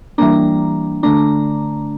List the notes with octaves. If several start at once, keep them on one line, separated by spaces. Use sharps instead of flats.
E3 G3 A#3 D4 A#5
D3 A3 D4 A#5